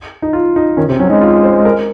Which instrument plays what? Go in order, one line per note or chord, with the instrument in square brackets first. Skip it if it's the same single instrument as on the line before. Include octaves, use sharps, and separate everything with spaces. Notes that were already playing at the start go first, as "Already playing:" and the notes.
[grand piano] D#4
F4
D#4
[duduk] D#3 [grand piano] C#4
[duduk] C3 [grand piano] C4
[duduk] F#3 [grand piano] C#4
[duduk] G#3 [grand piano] D#4
[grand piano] F4
C5
A#4